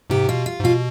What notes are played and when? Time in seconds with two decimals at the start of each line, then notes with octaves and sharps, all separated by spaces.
0.10 G#2 C3 G4
0.28 B2 F4
0.46 F4
0.59 G#2
0.64 B2 F4